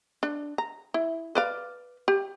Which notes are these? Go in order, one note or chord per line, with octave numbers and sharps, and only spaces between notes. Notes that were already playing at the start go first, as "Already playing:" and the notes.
D4
A#5
E4
B4 D5 F5
G4